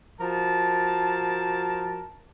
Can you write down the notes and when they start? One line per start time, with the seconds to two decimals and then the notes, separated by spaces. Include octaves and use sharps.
0.21 F3 F#4 A#4 A5